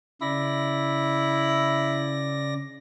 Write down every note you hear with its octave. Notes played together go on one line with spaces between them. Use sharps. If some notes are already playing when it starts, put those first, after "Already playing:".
C#3 E4 D5 A#6